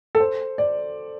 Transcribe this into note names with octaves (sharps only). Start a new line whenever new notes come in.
A4
C5
D5